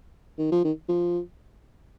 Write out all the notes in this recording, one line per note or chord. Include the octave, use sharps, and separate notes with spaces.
D#3
F3
D#3
F3